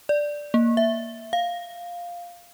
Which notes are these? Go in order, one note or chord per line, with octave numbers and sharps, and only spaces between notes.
D5
A#3
E5
F5